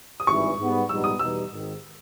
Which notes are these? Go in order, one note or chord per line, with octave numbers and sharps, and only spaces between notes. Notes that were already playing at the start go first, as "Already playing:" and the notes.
D#6
G#1 G2 E3 C#6
G#2 G3 B3
A#1 G#2 G3 B3 D#4 E6
D#6
E2 B2 G3 B3 D#4 E6
G#1 G#2 D#3